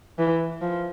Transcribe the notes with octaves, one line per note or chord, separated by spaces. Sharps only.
E3
F3